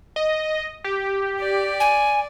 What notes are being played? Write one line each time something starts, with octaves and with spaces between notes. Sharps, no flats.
D#5
G4
D5
G#5